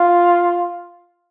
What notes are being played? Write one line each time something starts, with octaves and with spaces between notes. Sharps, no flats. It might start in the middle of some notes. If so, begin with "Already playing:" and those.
Already playing: F4